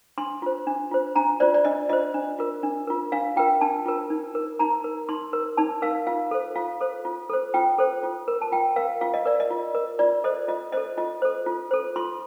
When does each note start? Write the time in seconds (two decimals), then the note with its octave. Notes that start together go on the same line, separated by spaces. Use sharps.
0.18 D4 C6
0.42 F4 C5
0.67 D4
0.91 F4 C5
1.16 D4 A#5
1.40 F4 C5 D5
1.54 D5
1.65 D4 D#5
1.89 F4 C5 D#5
2.14 D4
2.39 F4 A#4
2.63 D4
2.87 F4 A#4
3.12 D4 F5
3.36 F4 A#4 G5
3.61 D4 A5
3.86 F4 A#4
4.10 D#4
4.35 A#4
4.59 D#4 A#5
4.84 A#4
5.09 D#4 C6
5.33 A#4
5.57 D#4 A5
5.82 A#4 F5
6.07 F4 F5
6.31 A4 C5
6.56 F4 F5
6.81 A4 C5
7.05 F4
7.30 A4 C5
7.54 F4 G5
7.78 A4 C5
8.03 F4
8.28 A#4
8.42 A5
8.52 F4 G5
8.76 A#4 F5
9.01 F4 F5
9.14 D#5
9.25 A#4 D5
9.40 D#5
9.50 F4
9.75 A#4
9.99 F4 D5
10.24 A4 C5 D#5
10.48 F4 D#5
10.72 A4 C5 D#5
10.98 F4 D#5
11.22 A4 C5
11.46 F4
11.71 A4 C5
11.96 F4 C6